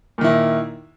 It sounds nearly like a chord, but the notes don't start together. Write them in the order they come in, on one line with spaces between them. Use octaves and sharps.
A#2 D#3 E4